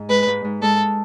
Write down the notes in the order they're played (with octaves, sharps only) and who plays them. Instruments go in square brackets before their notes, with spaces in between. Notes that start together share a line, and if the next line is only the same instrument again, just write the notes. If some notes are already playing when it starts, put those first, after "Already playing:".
Already playing: [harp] G#2
[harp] G#3 [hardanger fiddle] B4
[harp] G#2
G#2
[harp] G#3 [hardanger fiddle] A4